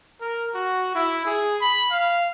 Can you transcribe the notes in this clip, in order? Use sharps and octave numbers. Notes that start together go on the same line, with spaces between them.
A#4
F#4
E4
G#4
B5
F5